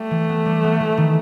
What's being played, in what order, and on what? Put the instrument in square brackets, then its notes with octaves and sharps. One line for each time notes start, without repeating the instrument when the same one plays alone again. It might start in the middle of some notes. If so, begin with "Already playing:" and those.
Already playing: [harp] G3 [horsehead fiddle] A3
[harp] E3
B3
G3
B3
E3
D#3